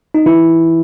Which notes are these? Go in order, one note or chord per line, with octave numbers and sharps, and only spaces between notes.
D#4
E3 E4